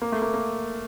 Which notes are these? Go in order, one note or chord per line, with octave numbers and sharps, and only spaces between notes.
A#3
A3
A#3
A#3